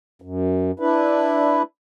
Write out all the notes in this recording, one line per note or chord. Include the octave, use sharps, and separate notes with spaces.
F#2
D4 E4 B4